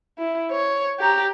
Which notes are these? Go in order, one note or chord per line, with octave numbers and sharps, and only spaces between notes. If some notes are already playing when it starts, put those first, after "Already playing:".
E4
C#5
G4 A#5